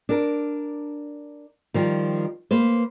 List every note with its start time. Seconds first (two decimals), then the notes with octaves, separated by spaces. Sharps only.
0.09 D4 A#4
1.74 D#3 F3 G3
2.51 A#3 B4 C5